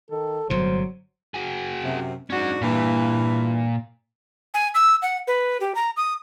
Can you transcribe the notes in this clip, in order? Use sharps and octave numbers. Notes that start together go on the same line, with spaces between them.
D#3 A4
G1 A2 C3 F#3 C5
F#4 G#4
F#2 C3
G#2 C#4 D4 F#4 F#5
G2 A#2 E3
G#5
E6
F#5
B4
G4
A#5
D#6